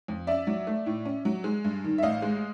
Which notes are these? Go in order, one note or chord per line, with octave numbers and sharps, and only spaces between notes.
F2
C#4 D5 E5
F#3
A3
A2
C#4
F#3
G#3
G2
D#3
E5
A1 D#5 F5
G#3